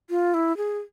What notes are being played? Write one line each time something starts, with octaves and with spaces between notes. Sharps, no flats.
F4
E4
G#4